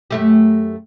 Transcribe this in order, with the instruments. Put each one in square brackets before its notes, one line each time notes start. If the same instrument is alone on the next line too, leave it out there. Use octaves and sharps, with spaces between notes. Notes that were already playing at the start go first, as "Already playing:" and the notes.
[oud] F#2 A3 G4